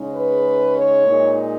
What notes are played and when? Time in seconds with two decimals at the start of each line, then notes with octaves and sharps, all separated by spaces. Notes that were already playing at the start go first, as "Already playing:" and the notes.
Already playing: C#3 G#3 D#4
0.11 B4
0.75 C#5
1.06 A#2 G#3 D#4